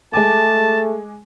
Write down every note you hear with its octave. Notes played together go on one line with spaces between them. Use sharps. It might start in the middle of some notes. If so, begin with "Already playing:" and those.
G#3 A3 G#5 A5 D6